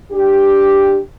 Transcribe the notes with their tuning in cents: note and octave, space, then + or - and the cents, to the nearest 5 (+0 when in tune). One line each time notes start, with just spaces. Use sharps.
D4 +0 G4 +0